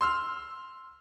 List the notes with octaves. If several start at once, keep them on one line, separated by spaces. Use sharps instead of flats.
C6 E6 F6